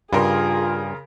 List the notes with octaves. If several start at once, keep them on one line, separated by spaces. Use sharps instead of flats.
G2 C#3 F4 G#4 A#4 C6